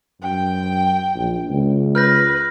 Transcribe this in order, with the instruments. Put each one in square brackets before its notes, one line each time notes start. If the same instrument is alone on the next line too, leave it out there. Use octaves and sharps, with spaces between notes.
[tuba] F#2 [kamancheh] G5
[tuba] A#1
C#2
[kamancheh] B4 [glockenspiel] F6 G6 A#6